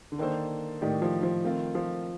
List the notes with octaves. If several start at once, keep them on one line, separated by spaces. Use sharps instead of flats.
D3
D#3 A#3 D4 A4 C5
A2 D#3 A3 D#4 G4 D5
F3
F3
D#3 A3 C4 F4
F3